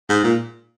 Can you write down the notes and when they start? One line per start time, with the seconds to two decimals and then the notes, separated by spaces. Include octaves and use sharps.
0.09 G#2
0.24 A#2